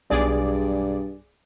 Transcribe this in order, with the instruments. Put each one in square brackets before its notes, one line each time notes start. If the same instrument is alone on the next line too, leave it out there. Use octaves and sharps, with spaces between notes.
[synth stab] B1 G#4 D5 [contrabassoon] G2